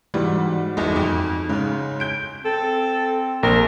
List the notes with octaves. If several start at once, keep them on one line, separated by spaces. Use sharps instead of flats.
G#2 E3 G3 F#4
G1 E2 D#4
F2
G#2 C#3 C#4
G6 D7
C4 A4
A#1 A#4